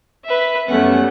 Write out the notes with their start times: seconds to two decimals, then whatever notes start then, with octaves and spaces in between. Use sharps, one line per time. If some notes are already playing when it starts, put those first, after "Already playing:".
0.25 B4 E5
0.68 F#2 G3 A3 B3 C#4 F#5